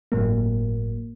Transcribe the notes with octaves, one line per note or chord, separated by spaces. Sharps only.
G1 A2 F#3 A#3